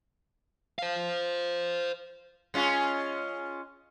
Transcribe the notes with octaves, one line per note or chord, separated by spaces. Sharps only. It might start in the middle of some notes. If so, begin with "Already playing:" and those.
C5 F5
G#3 C#4 F4